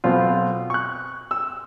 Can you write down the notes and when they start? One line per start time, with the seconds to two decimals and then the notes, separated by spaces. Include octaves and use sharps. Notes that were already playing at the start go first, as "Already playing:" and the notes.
0.04 B1 B2 C4 F4
0.70 C#6 F#6
1.31 E6